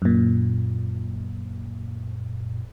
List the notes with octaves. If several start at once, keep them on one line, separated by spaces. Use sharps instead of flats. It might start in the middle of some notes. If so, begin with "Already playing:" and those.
F#2 A#2